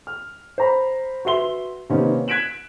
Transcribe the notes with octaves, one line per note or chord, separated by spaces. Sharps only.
F6
C5 A#5 B5
F#4 B4 E5 C6 G7
C3 D#3 A#3 B3 C#4 D#4
F#6 G#6 B6 D7 E7 F#7